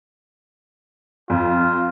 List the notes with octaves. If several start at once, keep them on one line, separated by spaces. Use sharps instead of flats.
F2 F4